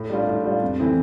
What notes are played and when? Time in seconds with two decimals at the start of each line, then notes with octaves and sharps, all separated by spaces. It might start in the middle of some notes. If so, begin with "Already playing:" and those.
Already playing: A2
0.10 G3 D4 F4
0.27 A2
0.44 G3 D4 F4
0.62 F2
0.80 E3 A3 C4 E4